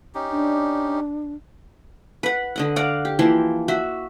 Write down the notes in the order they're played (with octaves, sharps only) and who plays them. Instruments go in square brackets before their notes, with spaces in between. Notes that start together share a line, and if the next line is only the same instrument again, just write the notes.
[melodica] C#4 D#4 G4
[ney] D4
[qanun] B4 F#5
D3 D#5 F#5
D5 F5 F#5 A#5
G4
E3 F3 A#3 C6
F#4 E5